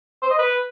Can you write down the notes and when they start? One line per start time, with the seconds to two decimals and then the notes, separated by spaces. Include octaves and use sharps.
0.22 C5
0.30 D#5
0.39 B4